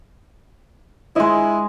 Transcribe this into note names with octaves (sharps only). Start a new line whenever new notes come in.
G#3 E4 D#5